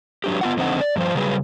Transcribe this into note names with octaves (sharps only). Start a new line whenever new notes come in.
F#3 D4 G4
B3 F4 F#5
F2 D3 C4 D#4 F#5
D5
G2 F3 C5
C#3 F#3 G3 G#4 B4